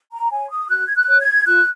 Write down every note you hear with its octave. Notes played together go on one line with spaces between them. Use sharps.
A#5
C#5 G#5
D#6
F#4 F#6
G#6
F#6
C#5
G#6
F4 F#6